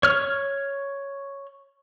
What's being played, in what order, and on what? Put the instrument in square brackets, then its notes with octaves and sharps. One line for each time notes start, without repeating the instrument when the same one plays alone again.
[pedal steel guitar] C#5 F6